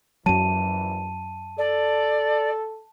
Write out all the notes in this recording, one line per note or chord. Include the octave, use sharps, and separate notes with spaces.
A#1 F#2 E3 F#3 A5 D#7
A4 D5